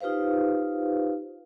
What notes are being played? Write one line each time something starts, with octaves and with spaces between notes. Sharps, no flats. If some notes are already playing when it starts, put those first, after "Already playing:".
D#4 F4 G4 B4 C5 F5